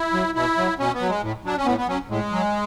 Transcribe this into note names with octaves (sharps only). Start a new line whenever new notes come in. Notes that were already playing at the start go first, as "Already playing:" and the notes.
Already playing: E4
F#3
B2 E4
F#3
B2 C#4
B3
F#3
G#3
A2
F#3 D4
C#4
A2 B3
B3
F#3 C#4
A2 G#3
F#3